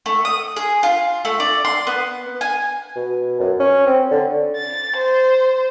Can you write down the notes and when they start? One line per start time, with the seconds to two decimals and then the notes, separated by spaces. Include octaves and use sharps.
0.06 A3
0.25 D#6
0.56 G#4
0.83 F4
1.25 A3
1.40 D5
1.65 C6
1.87 B3
2.41 G#5
2.96 B2
3.40 F#2
3.60 C#4
3.86 C4
4.11 D3
4.56 A6
4.96 C5